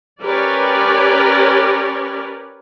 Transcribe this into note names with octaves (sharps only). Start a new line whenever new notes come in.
C#4 G4 A#4 B4 C#5 D5